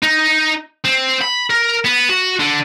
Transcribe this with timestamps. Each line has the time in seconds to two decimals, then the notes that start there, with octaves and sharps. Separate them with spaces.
0.03 D#4
0.85 C4
1.22 B5
1.50 A#4
1.85 B3
2.09 F#4
2.39 D3